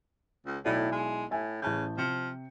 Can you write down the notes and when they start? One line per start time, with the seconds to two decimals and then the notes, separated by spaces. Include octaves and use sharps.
0.46 C#2
0.65 B1 A2 E4 D5
0.92 G#3
1.31 A2 E5 G#5
1.62 A1 C#3 A5 G6
1.98 C3 F3 C#7